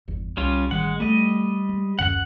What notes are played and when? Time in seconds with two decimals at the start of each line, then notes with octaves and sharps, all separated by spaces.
0.08 G1 E2
0.37 C2 G3 C#4 F4
0.71 A1 D#3 G3 G#3 F#5
1.00 G3 A3 D#5
1.69 G#3
1.99 D1 F#2 D3 F#5 F#6